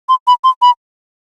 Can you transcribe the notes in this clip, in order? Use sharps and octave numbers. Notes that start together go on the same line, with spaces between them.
C6
B5
C6
B5